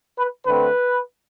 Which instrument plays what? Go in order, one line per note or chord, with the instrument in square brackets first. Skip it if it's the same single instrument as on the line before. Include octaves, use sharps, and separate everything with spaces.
[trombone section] B4
D3 A3 C4 B4